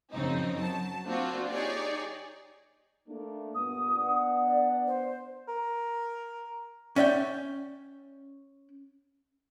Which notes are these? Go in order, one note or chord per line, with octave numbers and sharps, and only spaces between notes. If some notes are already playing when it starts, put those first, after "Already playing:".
F#2 C#3 F3 C4 D#4
F#3 A5
A#3 C4 D4 F4 F#4
D#4 G4 G#4 C#5 D5
A3 A#3 D4
G2 A#2 B3 D#6
B3 D4 F#5
D5
C5
A#4
C#4 D5 E5 F#5 G5